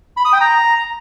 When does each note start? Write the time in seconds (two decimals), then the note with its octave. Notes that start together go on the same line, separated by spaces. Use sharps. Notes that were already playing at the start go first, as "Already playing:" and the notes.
0.17 B5
0.25 D#6
0.33 G5
0.41 A#5